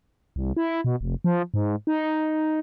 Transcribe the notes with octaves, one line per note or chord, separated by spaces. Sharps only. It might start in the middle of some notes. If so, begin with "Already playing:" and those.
C2
E4
B2
F1
F3
G#2
D#4